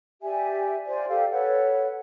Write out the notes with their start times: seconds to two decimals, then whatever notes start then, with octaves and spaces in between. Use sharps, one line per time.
0.23 G4 D5 E5 G#5
0.86 F4 C5 D5 G#5
1.09 G4 A4 D5 F5
1.32 A4 B4 C#5 F#5